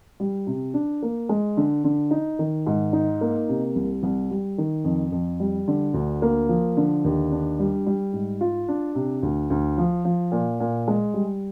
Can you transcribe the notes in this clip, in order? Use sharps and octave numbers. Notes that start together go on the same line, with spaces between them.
G3
C3
D4
A#3
G#3
D3
D3
D#4
D#3
G#2
D#4
A#3
C3
C2
C2
G3
D#3
F2
F2
G3
D3
D2
A#3
F3
D3
D#2
D4
G3
G3
G#2
F4
D4
C3
D2
D2
F3
F3
A#2
A#2
G#3
G3